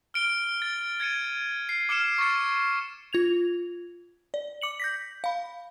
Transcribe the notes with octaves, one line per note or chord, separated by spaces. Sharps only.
F6 D7 G7
A6
G#6 A6 C#7 D#7
C7
D6 F6 C#7 E7
C#6 D6 A6 C#7
F4 G#6 F7
D5
D6 C#7 F#7
G6 A#6 B6
F5 B5